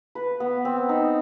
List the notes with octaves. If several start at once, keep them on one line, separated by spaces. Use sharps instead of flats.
B4
B3
C4
D#4